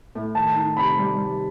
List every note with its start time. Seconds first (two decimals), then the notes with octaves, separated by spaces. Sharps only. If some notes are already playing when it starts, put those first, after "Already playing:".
0.15 A2
0.35 D#3 A5
0.56 D#4
0.77 C3 B5
0.98 G3
1.18 G3